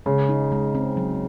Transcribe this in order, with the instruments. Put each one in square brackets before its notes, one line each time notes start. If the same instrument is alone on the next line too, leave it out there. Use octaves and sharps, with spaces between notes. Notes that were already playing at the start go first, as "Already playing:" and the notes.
[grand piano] C#3 [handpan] G#3
[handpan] D#4
G#3
C4
F#3